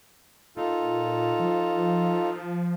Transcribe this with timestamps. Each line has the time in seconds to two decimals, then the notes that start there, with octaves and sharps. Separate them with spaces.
0.57 A#2 D#4 F4 A4
1.39 F3